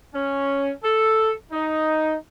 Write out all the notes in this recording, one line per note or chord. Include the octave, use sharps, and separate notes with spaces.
C#4
A4
D#4